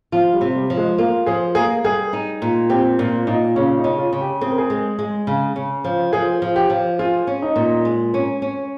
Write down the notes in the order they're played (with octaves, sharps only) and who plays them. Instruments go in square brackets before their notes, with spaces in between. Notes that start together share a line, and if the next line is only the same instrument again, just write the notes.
[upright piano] F3 [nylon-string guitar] F4
[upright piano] G3
[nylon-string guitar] C3
[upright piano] G3
[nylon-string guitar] F3
[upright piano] G#3
[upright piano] A#3 [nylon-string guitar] F4
[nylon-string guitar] F3 [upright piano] G#4
[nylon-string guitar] A#3 [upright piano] G#4
[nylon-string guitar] G3 [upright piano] G#4
[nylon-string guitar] D#4
A#2
[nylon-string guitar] C4 [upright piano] G4
[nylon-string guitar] A#2 [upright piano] F4
[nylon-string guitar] A#2 [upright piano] D#4
[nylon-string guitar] C#3 [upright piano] C#4
[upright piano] D#4
[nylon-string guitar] C#3
[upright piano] F4
[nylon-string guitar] C#3
[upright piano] G4
[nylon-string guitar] C4 [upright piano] G#4
[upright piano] A#4
G#4
[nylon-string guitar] G#3
G#3
C#3
C#3
F3
[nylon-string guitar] F3 [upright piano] G#4
[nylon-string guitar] F3
[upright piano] G4
[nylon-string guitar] F3
[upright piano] F4 [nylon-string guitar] G#4
[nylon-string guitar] C#4
[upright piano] D#4
[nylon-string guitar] A#2
G#3
C#4
C#4